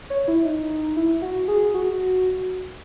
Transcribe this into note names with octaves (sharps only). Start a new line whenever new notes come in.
C#5
E4
D#4
E4
F#4
G#4
F#4